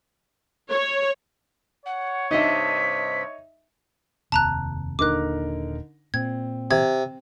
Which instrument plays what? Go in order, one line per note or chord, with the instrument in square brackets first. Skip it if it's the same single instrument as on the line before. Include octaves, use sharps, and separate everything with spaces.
[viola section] C#5
[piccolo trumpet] C#5 [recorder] F#5
[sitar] G2 C3 D#5 [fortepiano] D#4 E5 [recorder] B6
[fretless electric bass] F1 D#2 C3 [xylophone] A5 A#5 F#6
[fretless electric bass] D#1 A#2 [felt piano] D3 D#4 A#4 [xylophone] D6 F#6
[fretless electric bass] A#2 [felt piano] C4 [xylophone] G#6
[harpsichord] C3 [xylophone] G#6